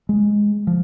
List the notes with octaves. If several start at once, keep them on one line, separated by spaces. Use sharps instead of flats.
G#3
F3